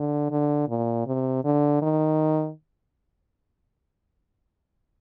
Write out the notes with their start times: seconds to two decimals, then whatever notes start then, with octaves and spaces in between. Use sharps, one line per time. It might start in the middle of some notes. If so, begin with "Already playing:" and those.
Already playing: D3
0.31 D3
0.69 A#2
1.06 C3
1.44 D3
1.82 D#3